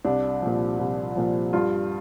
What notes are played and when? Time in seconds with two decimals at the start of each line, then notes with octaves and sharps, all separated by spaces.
0.04 C2 D4
0.42 A#2 F3
0.79 C2
1.16 A#2 F3
1.53 G2 F4